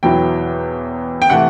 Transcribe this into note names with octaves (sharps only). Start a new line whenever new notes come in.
E2 B2 F#3 B3 E4 G5
G5
C3 E3 A3 F#5